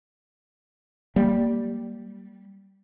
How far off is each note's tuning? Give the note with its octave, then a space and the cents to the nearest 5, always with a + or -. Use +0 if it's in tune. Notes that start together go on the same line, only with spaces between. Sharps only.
G3 -10 A#3 +0